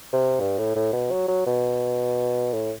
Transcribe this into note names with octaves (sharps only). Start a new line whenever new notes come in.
C3
G2
A2
A2
B2
F#3
F#3
B2
A2